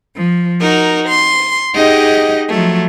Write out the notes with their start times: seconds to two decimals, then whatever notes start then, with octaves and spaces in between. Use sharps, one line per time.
0.16 F3
0.61 D#4 F#4 A#4
1.10 C6
1.75 D#4 G4 G#4 D#5 F#5
2.50 F3 F#3 A3